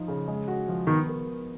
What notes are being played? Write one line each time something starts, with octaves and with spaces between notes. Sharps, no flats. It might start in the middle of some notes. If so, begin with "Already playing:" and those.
Already playing: F3 D#4
C#3
G#3
F#4
F3
D#3 B3
A#4